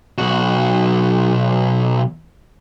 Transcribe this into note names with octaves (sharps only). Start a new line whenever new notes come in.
B1 F#4